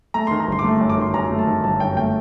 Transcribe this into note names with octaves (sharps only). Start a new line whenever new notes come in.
A3 A#5
D#3 C6
A#5
G1 C6
D6
A3 C6
F#2
D6
D#3 C6
F#2 A#5
A3
A5
D#3
G1 A5
F#2 G5
A3 G5